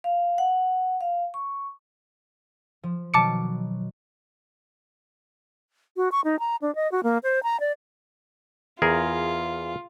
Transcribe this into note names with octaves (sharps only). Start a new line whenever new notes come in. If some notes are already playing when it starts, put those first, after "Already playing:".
F5
F#5
F5
C#6
F3
B2 D#3 F#3 A5 D6 C#7
F#4
C#6
D#4
A#5
D4
D#5
F#4
A#3
C5
A#5
D5
E2 F4 G#4 A#4